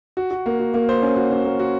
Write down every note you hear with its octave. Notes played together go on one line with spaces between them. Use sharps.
F#4
F#4
A#3
F#4
A#3
C5
C#4
F#4
C#4
A#3
F#4